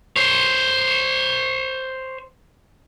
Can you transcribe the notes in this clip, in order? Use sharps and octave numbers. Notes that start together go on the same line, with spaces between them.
C5 C#5